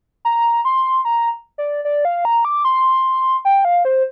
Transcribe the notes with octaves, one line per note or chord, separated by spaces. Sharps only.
A#5
C6
A#5
D5
D5
F5
A#5
D6
C6
G5
F5
C5